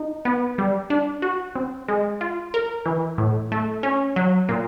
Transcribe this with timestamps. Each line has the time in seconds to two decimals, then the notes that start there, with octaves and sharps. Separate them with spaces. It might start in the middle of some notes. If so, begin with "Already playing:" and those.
Already playing: D#4
0.25 B3
0.58 G3
0.90 D4
1.22 F#4
1.55 C4
1.88 G#3
2.21 F4
2.54 A#4
2.86 E3
3.18 A2
3.52 A3
3.83 C#4
4.16 F#3
4.49 A#2